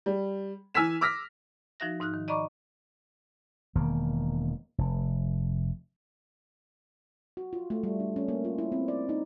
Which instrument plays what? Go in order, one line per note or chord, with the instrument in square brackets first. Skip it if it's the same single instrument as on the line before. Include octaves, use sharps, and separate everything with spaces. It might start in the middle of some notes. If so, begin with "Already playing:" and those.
[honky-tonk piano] G3
E3 G#5 E6 F6 B6 E7
D6 E6 F6 A#6 B6
[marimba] F3 D#4 F#4 E5 A#6
G#2 D#4 F6 F#6
D#3
D5 D#5 A#5 B5 C#6 D6
[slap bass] E1 D#3 A#3
F1
[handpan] F#4
F4
A3
G3
D4
C#4
A#3
F4
E4
C4
D5
D#4